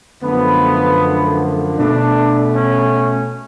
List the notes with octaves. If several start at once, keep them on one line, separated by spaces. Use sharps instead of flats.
F#2 D3 F3 A3 B3
B2 A3 D4
C#4